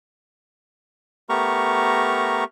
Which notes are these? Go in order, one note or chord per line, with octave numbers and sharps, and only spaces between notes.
A3 B3 G4 A#4 A#5 C#6